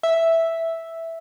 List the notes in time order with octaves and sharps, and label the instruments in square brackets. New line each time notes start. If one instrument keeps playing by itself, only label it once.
[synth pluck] E5